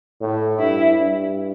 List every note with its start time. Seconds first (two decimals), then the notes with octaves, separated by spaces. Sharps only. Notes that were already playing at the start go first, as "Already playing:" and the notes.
0.21 A2
0.59 G2 E4
0.97 G2